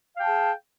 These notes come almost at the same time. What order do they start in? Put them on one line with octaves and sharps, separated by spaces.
F5 G5 A5 G#4